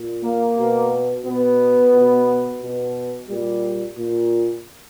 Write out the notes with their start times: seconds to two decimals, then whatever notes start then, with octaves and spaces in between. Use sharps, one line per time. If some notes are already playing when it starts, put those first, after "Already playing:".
Already playing: A#2
0.23 A#3
0.58 B2
1.24 B2 B3
1.93 B2
2.61 B2
3.28 A#2 G3
3.96 A#2